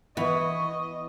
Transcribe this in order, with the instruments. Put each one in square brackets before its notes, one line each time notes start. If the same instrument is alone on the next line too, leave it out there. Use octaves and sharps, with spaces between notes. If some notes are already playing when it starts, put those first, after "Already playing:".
[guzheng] E3 [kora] B3 [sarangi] D#5 [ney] C#6